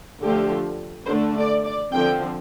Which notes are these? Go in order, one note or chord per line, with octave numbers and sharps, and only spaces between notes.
D3 F3 A3 G4
D3 A3 D4 C5
D5
D5
D3 F3 C4 G5